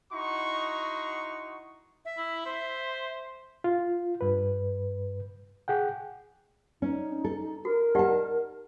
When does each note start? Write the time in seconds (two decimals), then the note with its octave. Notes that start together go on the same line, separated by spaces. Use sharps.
0.13 D#4 E4 F#4 C6 C#6
2.05 E5
2.17 E4
2.46 C5
3.64 F4
4.21 G2 B4
5.68 G#4 F#5 G5
6.82 C#4 D#4
7.24 A4
7.65 F#4 A#4
7.95 D#4 G4 D#5 F#5 A5